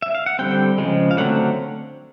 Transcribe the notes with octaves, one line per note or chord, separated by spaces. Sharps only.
E5
F5
F#5
D3 G3 C4 G5
C#3 F3 G#3
F5
D3 F#3 A3 C4 F#5